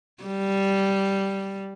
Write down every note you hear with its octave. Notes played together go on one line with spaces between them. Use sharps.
G3